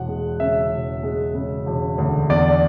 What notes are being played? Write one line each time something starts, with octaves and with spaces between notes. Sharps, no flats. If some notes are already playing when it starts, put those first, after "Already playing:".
Already playing: E1 F#5
G#3
C#3 E5
E1
G#3
C#3
E1
D2
E2 D5